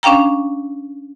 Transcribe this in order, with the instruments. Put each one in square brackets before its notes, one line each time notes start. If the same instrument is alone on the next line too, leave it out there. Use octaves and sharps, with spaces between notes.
[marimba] C#4 D4 F5 G5 A#5